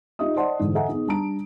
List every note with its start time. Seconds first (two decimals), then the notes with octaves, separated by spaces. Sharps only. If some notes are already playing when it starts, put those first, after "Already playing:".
0.19 D#4 F4 G4 D#5 E5 D#6
0.36 C5 D5 D#5 F#5 A5 C6
0.59 G#2 D3 E3
0.75 A4 D#5 E5 F#5 G#5 A#5
0.88 B3 D#4 G#4
1.07 G3 D4 A5 A#5 D7